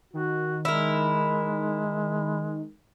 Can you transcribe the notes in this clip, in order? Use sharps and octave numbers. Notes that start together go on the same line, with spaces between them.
D#3 F#4
G#3 E4 A#4